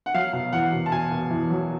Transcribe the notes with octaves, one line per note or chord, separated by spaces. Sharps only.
F#5
F#3 F5
B2
E2 F#5
B2
A5
B2 G#5
B2
E2
F#3